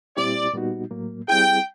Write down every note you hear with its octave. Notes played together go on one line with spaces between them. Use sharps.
A#2 G3 C4 E4 G4 D5
A#2 G3 B3 D#4 F#4
A2 F#3 A#3
G3 C4 E4 G#4 G5